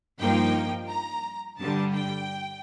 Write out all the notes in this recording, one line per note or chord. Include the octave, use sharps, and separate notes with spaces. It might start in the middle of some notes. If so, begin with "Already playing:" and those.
G2 F3 A#3 D#4 G5
A#5
G2 D3 G3 A5
G5